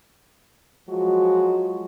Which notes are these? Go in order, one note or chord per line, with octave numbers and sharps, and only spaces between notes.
F3 F#3 G#3 F4 F#4